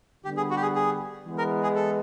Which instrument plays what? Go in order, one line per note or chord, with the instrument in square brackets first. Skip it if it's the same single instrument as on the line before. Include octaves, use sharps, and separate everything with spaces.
[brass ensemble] D3 G3 B3 [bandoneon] G4
[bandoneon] G#4
F#4
G4
G#4
G#4
[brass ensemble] E3 G#3 B3
[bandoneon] A#4
G#4
A4